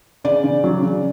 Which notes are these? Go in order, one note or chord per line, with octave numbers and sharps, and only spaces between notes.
C#3 D5
C#3
F#3
C#3